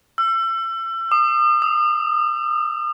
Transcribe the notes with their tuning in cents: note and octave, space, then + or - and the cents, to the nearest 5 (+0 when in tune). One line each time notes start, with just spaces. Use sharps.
E6 +30
D#6 -40
D#6 +15